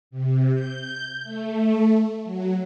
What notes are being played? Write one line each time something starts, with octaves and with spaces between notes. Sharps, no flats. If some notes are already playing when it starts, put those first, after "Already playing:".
C3
G6
A3
F#3